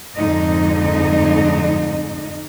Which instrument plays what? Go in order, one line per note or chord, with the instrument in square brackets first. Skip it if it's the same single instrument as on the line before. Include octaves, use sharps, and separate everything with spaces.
[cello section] F2 G#2 D3 D#4 D#5